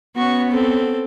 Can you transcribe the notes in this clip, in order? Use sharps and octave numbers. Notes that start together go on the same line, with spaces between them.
B3 C#4 F#4 C#6
C4 A4